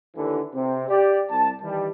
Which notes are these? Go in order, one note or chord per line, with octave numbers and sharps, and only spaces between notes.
D#2 D3 E3
C3 C4
G4 D5
C2 A5
D#3 E3 G3